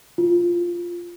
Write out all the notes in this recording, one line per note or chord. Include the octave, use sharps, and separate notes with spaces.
F4